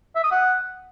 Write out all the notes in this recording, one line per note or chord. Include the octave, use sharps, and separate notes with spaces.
E5
D#6
F#5